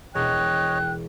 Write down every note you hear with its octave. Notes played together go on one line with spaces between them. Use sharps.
E1 C#5 D#5 G5 F#6